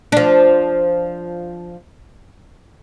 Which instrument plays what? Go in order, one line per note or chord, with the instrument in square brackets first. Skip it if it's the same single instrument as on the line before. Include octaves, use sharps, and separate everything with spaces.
[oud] F3 D4